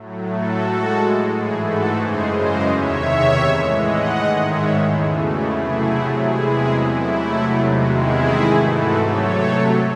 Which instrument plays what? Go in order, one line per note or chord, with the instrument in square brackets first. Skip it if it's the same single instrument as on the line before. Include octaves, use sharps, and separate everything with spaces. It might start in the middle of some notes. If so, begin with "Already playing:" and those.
Already playing: [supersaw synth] A2 F#3 A3
F#4 A4
A2 G#3
G#2 E3 A3 E4 G#4
F#4 A4
F#2 C#3 E3 G#3 G#4 C5
C5 D#5
E2 C3 D#3 C#5 E5
A2 E3 G#3
D#5 F#5
G#2 D#3 G#3
C#5 E5
E2 C#3 E3 A3 E4 G#4
F#4
C3 F#3 A3 E4 G#4
E2 C3 E3 G#3 E4 G#4
C3 F#3 A3 E4
E2 C3 D#3 G#3 F#4
E4 G#4
G#2 E3 A3
F#4 A4
C3 F#3 A3 A4 C#5